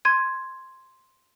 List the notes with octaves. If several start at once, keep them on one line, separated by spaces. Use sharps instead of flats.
C6 G#6 D#7